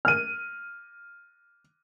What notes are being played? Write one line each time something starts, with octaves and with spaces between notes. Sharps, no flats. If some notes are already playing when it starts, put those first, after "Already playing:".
F6 D#7